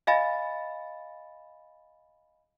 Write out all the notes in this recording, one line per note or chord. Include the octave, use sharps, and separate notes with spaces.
D#5 F5 G#5 B5 A6